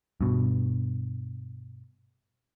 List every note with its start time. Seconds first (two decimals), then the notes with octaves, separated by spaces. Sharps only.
0.21 G2 B2